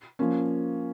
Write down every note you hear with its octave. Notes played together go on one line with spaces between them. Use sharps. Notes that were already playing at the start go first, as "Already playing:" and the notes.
F3 A#3 C#4